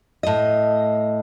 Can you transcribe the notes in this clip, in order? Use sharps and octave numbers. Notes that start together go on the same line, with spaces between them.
A2 D#5